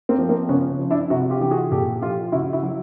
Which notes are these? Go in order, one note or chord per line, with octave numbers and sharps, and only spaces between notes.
A#3 C4
F3
A#3 C4
C#3 B3 C#4
F3
D4 E4
C3 E4 F#4
F4 G4
E3 G4
F#4 G#4
A#2 G4 A4
F3 F4 G4
C#3 E4 F#4
E4 F#4
F#3